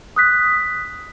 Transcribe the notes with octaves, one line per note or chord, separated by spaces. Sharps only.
D#6 F#6 B6